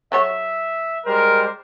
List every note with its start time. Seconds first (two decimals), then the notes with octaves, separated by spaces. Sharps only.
0.12 F#3 A4 C#5 E5
1.06 G3 G#3 A#4 C5